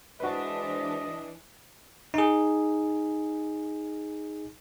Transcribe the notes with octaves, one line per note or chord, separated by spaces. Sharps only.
E3 G#3 D4 F#4 B4 C5 D#5
D#4 G#4